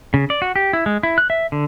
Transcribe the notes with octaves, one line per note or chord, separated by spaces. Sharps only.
C#3
D5
F#4
G4
E4
G#3
E4
F#6
E5
D3